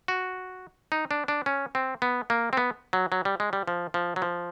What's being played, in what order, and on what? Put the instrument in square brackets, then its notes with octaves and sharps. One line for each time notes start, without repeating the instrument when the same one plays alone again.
[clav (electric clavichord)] F#4
D#4
D4
D4
C#4
C4
B3
A#3
C4
B3
F#3
F#3
G3
G#3
G3
F3
F3
F#3
F3